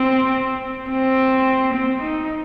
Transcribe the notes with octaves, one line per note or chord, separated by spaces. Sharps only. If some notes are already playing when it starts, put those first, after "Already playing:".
Already playing: C4
C4
C4
D#4